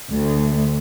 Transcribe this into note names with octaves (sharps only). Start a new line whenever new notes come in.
D2